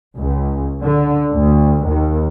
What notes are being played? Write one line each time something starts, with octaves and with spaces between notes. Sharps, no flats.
C#2
D3
D2
D#2